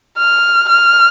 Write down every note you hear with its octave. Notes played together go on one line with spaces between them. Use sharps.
F6
F6